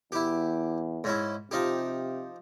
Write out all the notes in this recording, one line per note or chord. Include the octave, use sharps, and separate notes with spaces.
E2 E4 G4
G#2 C#4 E4
C3 F3 D#4 G4